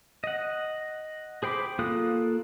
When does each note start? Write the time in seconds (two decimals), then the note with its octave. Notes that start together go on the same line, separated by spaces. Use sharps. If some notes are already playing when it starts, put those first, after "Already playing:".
0.24 D#5 F#5
1.43 G#4 C5 G5 B5 D6
1.79 A#3 F4 A4 D#6 F#6